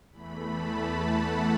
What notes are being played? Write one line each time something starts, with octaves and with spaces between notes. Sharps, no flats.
E2 E3 A3 B5
A5
F#5